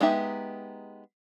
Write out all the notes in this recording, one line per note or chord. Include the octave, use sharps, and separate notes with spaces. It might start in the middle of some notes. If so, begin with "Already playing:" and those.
G#3 B3 D#4 G4 E5